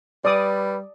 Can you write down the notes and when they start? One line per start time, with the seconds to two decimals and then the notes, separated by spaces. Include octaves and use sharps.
0.25 G3 B4 D5 D#6